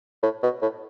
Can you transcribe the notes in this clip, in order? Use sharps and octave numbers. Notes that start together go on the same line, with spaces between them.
A2
B2
A2